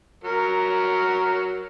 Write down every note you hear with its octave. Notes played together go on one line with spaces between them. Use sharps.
F#3 A#4